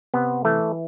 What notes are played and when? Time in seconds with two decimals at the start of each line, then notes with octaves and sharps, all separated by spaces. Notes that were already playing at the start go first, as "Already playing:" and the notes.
0.14 C3 B3
0.45 E3 A3